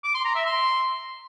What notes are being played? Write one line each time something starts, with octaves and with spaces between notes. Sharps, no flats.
D6
C6
A#5
E5
C6